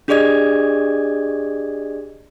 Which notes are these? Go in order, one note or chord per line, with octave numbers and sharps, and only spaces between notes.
D4 G4 G#4 D5 D#5 G#6